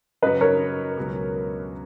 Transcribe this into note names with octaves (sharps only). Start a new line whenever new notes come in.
F#2 C#3 F#3 B4 D#5
A#4 C#5
C#2 B2 F#3